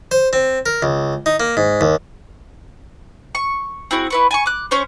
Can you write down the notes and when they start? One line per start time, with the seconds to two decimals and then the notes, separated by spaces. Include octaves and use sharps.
0.11 C5
0.33 C4
0.66 A#4
0.83 C#2
1.26 D#4
1.40 A#3
1.57 G#2
1.81 D#2
3.35 C#6
3.91 C4 E4 F#4 G#4
4.10 E4 B4 C#6
4.31 G#5 A5 C#6
4.46 D6 F#6
4.71 C#4 C5 C#5